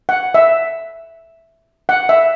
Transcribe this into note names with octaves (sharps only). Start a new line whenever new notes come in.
F#5
E5
F#5
E5